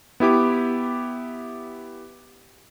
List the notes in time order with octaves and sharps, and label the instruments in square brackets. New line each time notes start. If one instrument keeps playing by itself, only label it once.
[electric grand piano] B3 E4 G4 D6